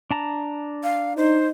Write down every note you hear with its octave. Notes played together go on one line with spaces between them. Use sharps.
D4 A5 A#5
F5
D#4 C5